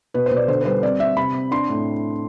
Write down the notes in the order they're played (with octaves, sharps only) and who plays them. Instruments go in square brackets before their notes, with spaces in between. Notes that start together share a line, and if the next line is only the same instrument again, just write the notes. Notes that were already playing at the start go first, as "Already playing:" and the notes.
[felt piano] B2 B4
C5
B2
D5
D3 C5
B4
G3 C5
C4 D5
C4 E5
C3 B5
C4
D4 C6
A2